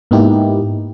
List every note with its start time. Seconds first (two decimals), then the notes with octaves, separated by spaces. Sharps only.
0.11 G#2 A#3 B3 D#4 E4 G4